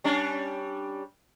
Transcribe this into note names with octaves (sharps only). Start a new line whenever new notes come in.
G3 C#4 D4